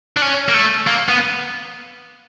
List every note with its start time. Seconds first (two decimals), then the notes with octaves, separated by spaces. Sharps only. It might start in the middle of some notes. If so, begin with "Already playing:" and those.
0.17 D4
0.22 C#4
0.49 A#3
0.54 A3
0.87 A#3
1.09 B3